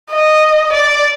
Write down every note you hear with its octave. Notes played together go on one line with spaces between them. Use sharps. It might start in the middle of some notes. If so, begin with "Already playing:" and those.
D#5
D5